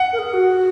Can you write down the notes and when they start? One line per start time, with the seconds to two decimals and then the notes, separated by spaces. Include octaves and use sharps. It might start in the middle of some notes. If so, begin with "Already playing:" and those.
Already playing: F#5
0.13 A#4
0.19 G#4
0.33 F#4